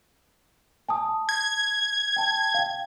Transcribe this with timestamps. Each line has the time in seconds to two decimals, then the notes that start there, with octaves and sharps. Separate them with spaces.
0.89 G#5 A5 D#6
1.29 G#6
2.16 G5 A5
2.54 F5 G5